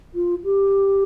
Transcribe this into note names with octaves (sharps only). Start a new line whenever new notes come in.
F4
G4